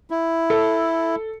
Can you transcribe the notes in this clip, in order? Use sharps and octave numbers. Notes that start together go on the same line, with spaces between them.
E4
A4